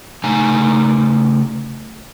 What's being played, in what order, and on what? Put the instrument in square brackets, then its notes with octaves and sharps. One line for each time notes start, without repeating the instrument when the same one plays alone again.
[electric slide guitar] C#3 A3 D#4 G#5 A#5